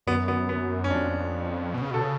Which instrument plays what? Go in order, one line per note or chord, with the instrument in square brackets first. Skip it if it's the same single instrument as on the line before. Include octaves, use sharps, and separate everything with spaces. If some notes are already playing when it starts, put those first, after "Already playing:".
[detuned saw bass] F#2 [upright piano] B3
[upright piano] B3
B3
C#4
[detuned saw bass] F2 [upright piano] D4
[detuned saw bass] B2
C#3
[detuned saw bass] B2 [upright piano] A4
[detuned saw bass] C#3